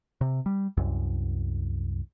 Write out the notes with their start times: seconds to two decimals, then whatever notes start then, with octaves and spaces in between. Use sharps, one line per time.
0.21 C3
0.46 G3
0.77 C2 F#2